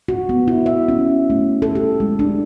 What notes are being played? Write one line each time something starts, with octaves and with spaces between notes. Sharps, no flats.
F#4
B3
E4
E5
C#4
A3
A4
G4
G#3
D4